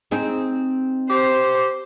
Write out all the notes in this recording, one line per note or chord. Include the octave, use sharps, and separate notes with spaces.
C4 D#4 G#4
G4 C5